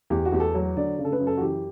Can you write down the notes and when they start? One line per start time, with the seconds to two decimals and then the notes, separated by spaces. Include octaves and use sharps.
0.10 E2 G4
0.25 F#4
0.32 E2 G4
0.40 A4
0.55 F#3
0.77 D3 D5
0.98 C#3
1.04 A4
1.12 B4
1.20 F#2
1.27 A4
1.37 F#4
1.41 E3 G4